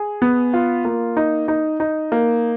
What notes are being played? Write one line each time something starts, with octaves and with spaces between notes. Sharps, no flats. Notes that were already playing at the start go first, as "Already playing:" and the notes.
Already playing: G#4
B3
F4
A#3
D#4
D#4
D#4
A#3